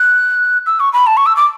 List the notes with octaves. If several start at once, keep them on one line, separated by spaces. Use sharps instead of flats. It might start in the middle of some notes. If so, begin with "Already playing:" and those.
Already playing: F#6
E6
C#6
B5
A5
C#6
E6
D6